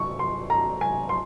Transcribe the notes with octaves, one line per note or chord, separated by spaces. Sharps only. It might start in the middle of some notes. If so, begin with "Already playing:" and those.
Already playing: C#6
C6
A#5
G#5
C6